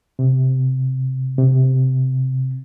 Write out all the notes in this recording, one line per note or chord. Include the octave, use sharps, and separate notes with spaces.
C3
C3